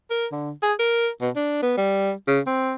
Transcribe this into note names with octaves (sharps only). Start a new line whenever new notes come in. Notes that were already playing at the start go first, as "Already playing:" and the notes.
A#4
D3
G#4
A#4
B2
D4
B3
G3
C#3
C4